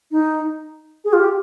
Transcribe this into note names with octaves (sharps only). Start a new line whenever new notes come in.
D#4
G#4
F4
G4